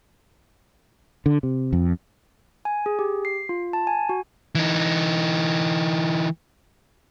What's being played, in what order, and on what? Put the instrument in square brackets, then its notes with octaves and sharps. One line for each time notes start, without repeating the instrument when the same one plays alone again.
[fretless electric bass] D3
C3
F2
[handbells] G#5
G#4
G4
C7
F4
A5
G#5
F#4
[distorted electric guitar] E3 D#4